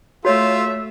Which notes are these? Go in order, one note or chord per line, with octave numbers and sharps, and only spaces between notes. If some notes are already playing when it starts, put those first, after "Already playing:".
A3 F4 F#4 C#5 E5